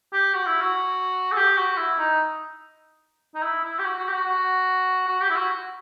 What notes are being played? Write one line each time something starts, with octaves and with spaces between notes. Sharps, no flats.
G4
F#4
E4
F#4
A4
G4
F#4
E4
D#4
D#4
E4
E4
G4
F#4
F#4
G4
F#4
F#4
F#4
G4
E4
F#4